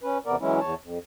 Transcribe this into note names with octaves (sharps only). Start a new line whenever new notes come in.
C#4 B4
E2 C3 B3 A#4 D5
E3 F#3 G#3 C#4 E4
E2 C#5 A5
F2